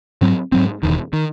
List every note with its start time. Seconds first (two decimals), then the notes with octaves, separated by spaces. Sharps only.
0.21 G#2 F#3 C4
0.52 G#2 F#3 C4
0.83 E1 E2 D#3
1.13 D#3